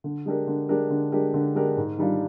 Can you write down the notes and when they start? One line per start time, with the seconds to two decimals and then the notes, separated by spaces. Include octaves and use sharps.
0.04 D3
0.26 G#3 D4 G4 A#4
0.47 D3
0.69 G#3 D4 G4 A#4
0.90 D3
1.12 G#3 D4 G4 A#4
1.34 D3
1.55 G#3 D4 G4 A#4
1.77 G#2
1.98 D#3 G3 D4 F4